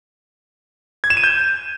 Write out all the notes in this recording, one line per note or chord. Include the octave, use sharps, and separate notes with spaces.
G#6
E7
D#7
G6